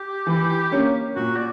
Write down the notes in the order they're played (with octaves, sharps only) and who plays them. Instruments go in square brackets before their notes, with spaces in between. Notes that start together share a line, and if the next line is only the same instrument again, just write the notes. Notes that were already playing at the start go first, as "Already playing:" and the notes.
Already playing: [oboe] G4
[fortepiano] E3
A#3 C#4
[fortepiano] A#2 [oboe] F#4
[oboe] D5